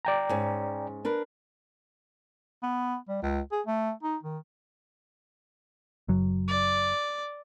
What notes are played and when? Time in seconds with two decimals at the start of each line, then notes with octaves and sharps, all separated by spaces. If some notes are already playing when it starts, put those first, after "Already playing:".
0.05 D5 G5 A#5
0.29 G#2 C#4
1.05 D4 A#4 B4
2.63 B3
3.09 G3
3.22 C#2
3.51 G#4
3.67 A3
4.03 D#4
4.23 D#3
6.08 F#1 F#2 F#3
6.48 D5